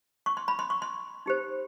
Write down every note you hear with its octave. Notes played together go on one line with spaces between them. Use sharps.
C#6
C6
B5
C6
C#6
C6
D#4 G4 C5